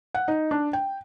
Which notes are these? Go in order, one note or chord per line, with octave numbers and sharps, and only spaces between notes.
F#5
D#4
D4
G5